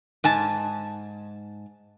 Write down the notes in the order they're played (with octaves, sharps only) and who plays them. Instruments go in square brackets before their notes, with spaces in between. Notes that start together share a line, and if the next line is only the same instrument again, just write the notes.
[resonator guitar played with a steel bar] G#2 G#5 A5